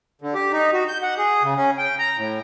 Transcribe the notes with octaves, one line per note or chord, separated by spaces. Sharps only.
D3
G4
D#4
F#4
G6
F#5
G#4
C#3
C#4
G5
A#5
A2